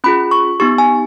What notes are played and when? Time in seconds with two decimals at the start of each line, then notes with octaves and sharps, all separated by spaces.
0.04 C#4 F4 G#4 B5
0.31 C#6
0.60 B3 D#4 G4 C#6
0.78 G#5